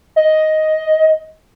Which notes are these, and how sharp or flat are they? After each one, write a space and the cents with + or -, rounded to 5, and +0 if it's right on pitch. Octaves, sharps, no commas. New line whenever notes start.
D#5 +5